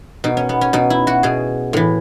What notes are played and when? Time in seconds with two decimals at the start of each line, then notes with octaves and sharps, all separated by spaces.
0.24 B2 D#4
0.37 C#4
0.49 B3
0.61 C#4
0.73 B2 D#4
0.90 E4
1.07 F#4
1.23 B2 G#4
1.73 A2 E3